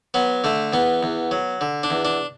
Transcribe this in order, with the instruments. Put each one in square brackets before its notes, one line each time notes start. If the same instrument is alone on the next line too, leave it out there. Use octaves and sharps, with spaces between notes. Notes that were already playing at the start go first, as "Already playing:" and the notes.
[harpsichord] F#3 B3
D3 A3
E2 B3
E2
F#3
D3
D4
E2
D4